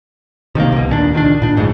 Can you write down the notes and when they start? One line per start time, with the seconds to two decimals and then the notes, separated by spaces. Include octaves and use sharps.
0.55 C3 D#3 A3 A#3
0.72 C2 B2
0.89 D#2 A#2 C#4 D4
1.13 C#2 D#3 E3 D4
1.42 A#2 D4
1.57 F#1 D2 G#2 C#3